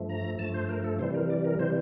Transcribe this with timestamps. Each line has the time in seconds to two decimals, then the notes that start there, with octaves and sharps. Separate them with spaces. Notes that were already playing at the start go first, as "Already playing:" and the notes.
Already playing: G2 F3 A3
0.09 A#5
0.39 G2 F3 A3 A5
0.54 C5
0.69 A#4
0.84 A4
0.99 C3 E3 G3 C5
1.14 A#4
1.30 D5
1.44 A#4
1.59 C3 E3 G3 C5